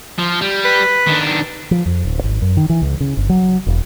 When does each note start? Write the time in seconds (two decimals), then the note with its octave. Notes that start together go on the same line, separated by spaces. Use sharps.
0.19 F3 F4
0.41 G3
0.65 B4
1.08 D#3 D4
1.71 F3
1.86 F2
2.05 D1
2.24 G#1
2.42 F#2
2.57 D#3
2.70 E3
2.82 C#2
3.00 C#3
3.17 G1
3.29 F#3
3.67 E1